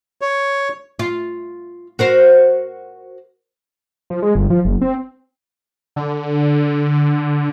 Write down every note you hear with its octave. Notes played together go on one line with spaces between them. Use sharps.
C#5
F4
F#4 A#4 C5
F3
G#3
G1
F3
F#1
C4
D3